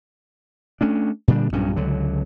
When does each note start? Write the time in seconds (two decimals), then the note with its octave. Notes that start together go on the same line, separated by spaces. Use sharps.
0.81 A3 C#4 D4
1.28 A#2 D3 G3 D4
1.53 B1 G2 A#2 C#4
1.76 C#2 D3 F#3